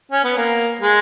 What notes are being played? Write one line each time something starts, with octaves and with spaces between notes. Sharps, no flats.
C#4
B3
A#3
G#3